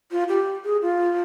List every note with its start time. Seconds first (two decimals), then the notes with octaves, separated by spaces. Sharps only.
0.11 F4
0.29 G4
0.65 G#4
0.82 F4